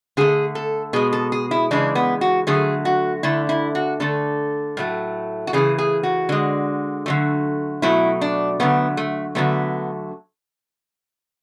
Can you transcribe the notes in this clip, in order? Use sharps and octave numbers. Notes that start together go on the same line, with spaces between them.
D3 A3 G#4
A4
B2 G#3 G#4
A4
G#4
E4
C#3 E3 G#3 D4
B3
F#4
D3 F#3 A3 G#4
F#4
D3 A3 E4
E4
F#4
D3 A3 A4
A2 F#3 A3
F#4
C#3 E3 A3 G#4
G#4
F#4
D3 G#3
D3 F#3 A3
B2 F#3 A3 E4
D4
D3 F#3 A3 B3
A3
D3 F#3 A3 B3